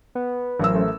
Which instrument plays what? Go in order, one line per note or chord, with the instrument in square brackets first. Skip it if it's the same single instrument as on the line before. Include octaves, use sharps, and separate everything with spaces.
[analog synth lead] B3
[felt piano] A1 A#4 E6 [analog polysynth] F#3 C#4 C5
[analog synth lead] A3